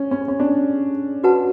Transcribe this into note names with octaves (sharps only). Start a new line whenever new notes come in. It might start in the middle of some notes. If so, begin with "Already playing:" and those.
Already playing: C#4
C#4
C#4
D4
F#4 B4 F#5 A5